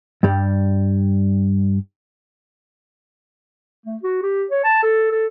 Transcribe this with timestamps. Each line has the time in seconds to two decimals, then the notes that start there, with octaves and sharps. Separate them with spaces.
0.23 G2 G3
3.86 A3
4.03 F#4
4.23 G4
4.51 C#5
4.64 A5
4.83 A4
5.11 A4